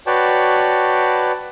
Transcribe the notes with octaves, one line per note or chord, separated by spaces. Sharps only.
F#4 B4 C#5 D5 G5 A5